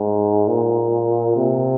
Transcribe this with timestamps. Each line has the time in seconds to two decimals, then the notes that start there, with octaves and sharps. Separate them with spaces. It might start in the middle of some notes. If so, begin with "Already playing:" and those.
Already playing: G#2
0.48 A#2
1.37 C3